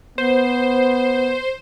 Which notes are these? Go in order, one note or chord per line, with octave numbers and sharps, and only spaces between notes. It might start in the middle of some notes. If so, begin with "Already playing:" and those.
B3 C5